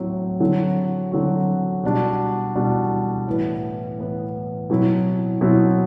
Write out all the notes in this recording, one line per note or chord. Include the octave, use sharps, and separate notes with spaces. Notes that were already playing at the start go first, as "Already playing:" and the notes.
Already playing: A2 F#3 C4
D3 F#3 C4 F#4
D3 F#3 C4 F#4
B2 G3 D4 F#4
B2 G3 D4 F#4
A2 E3 B3
A2 E3 B3
B2 F#3 C4 E4
B2 F#3 C4 E4